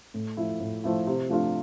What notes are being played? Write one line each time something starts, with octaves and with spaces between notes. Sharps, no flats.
A2
F3 A3 E4
A2
F3 A3 E4
C3
F3 A3 D4 F4